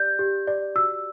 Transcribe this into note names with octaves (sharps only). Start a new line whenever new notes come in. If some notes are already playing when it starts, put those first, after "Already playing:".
Already playing: G4 D5 G6
G4
D5
F#4 E6